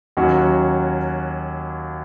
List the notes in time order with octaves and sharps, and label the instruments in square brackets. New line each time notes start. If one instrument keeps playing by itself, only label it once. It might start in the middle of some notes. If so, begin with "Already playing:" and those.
[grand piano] D#2 D#3 F#3 C#4 F#4